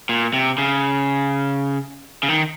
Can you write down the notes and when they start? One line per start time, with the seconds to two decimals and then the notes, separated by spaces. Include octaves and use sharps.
0.09 A#2
0.34 C3
0.58 C#3
2.23 C#3
2.28 D#3